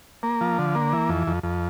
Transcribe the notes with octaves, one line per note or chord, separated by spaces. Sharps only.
A#3
F3
D3
A#3
E3
F2
F2
F2